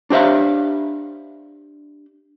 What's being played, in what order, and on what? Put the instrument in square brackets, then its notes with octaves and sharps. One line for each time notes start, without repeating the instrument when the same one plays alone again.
[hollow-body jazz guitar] D4 G4 C5 E5 F5